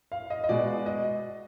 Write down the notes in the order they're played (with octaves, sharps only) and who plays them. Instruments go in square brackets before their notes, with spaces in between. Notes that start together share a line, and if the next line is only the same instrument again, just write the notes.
[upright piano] F5
D#5
D#5
B2 G#3 D5
D#5